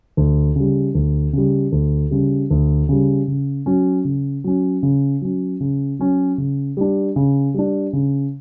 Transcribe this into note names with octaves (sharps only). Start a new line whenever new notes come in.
D2
C#3 G3
D2
C#3 G3
D2
C#3 G3
D2
C#3 G3
C#3
F#3 C#4
C#3
F#3 C#4
C#3
F#3 C#4
C#3
F#3 C#4
C#3
G3 D4
C#3
G3 D4
C#3